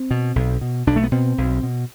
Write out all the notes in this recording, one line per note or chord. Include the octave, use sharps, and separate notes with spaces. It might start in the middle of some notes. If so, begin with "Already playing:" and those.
Already playing: C4
B2
B1
B2
B1 D4
A3
B3
B2 C4
B1
B2